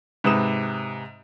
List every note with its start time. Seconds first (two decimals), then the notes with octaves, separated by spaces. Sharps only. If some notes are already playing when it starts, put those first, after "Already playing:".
0.24 G#2 C3 B4 D#6 E7